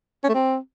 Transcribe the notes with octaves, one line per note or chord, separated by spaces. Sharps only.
C#4
A3
C4